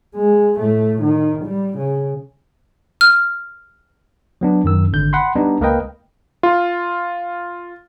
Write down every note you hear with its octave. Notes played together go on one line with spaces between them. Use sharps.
G#3
A2 A3
D#3
G3
C#3
F6
F#3 B3 D4
F#2 D#3 E6
G#1 D3 G6
F#5 B5 C6
G3 B3 D4 D#4
C#2 A#3 A#4 B4 D#5 G5
F4